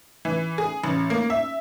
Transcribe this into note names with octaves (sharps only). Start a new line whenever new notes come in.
E3
G#4
A1
A#3
E5